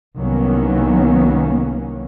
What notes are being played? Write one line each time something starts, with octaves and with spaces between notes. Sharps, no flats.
C2 D#3 F#3 A#3 B3 C#4